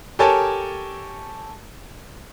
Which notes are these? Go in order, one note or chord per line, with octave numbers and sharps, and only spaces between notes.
G4 A4 A#4 C#5 G#5 A5